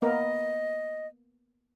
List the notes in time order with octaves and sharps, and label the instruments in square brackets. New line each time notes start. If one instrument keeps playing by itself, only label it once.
[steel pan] A#3 B3 A#4 [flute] D#5